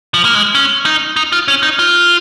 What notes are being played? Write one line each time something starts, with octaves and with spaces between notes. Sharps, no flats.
F3
A#3
G#3
C#4
D#4
D#4
F4
C#4
D#4
F4